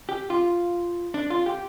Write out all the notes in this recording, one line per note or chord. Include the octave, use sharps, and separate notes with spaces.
G4
F4
D4
F4
G4